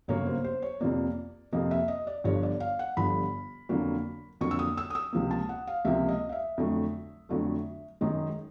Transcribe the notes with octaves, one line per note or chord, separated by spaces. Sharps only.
G1 F#2 C#3 F#3 A#3 C#5
C5
C5
C#5
F2 C3 F3 A#3 D5
F2 C3 F3 A#3 D#5
E5
D#5
D5
G1 G2 D3 F3 C#5
D5
F5
F#5
G1 G2 D3 F3 B5
F2 D3 F#3 A#3
F2 D3 F#3 A#3 C#6
E6
D#6
E6
D#6
E6
C#2 C3 F3 A#3
A5
F#5
F5
C#2 C3 F3 A#3 E5
D#5
F5
E5
F2 D3 F#3 A3
F2 D3 F#3 A3
F#2 D#3 G#3 D#5